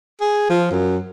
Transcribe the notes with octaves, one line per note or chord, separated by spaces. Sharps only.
G#4
F3
F#2